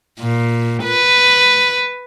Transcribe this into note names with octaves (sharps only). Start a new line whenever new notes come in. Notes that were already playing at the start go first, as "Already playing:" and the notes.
A#2
B4